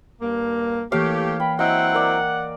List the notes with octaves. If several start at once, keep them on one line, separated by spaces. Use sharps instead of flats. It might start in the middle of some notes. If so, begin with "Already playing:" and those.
G2 A#3
E3 A3 A#3 G4 C#5 F5
G5 B5
F#3 C4 E4 D#5 F#5
A#4 D5